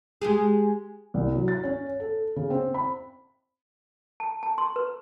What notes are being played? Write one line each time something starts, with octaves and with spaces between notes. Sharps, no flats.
G#3 G4 G#4
C2
F#3
A6
C#4
A4
C#3
C4
B5
A5
A5
C6
B4